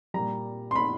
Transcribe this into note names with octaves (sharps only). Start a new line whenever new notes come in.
A#2 G3 A#5
C6
B5